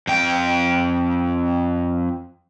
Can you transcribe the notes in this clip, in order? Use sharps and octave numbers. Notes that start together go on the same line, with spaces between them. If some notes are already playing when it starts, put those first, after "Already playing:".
F2 G5